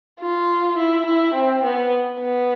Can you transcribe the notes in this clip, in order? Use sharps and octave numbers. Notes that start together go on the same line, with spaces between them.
F4
E4
E4
C4
B3
B3